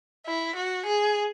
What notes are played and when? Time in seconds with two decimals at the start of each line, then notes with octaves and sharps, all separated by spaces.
0.26 E4
0.56 F#4
0.86 G#4